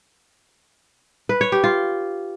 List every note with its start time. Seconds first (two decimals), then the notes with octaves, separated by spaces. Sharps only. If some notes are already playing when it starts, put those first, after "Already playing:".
1.29 B4
1.41 C#5
1.52 G4
1.64 F4